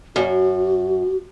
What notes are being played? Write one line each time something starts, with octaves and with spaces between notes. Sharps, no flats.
F#2 F#4